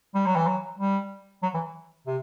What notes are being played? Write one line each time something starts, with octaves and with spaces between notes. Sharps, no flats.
G3
F#3
E3
F#3
G3
F#3
E3
C3